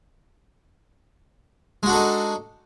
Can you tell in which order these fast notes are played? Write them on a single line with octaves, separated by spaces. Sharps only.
G#3 F#4 D4 A4 D#4